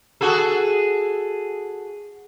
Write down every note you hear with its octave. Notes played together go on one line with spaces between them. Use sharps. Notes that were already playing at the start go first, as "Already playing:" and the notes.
F#4 G#4 A4